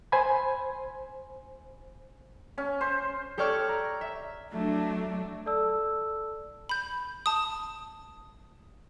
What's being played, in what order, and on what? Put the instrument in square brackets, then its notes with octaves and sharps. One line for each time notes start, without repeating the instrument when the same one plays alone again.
[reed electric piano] C5 G#5 B5
[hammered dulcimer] C#4
C5
[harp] G4 A4 C#5 D5 C#6 F6
A#5
E5
[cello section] F#3 D4 [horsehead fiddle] A3
[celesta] A4 D5 A5 E6
[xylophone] B5 G6
A5 D#6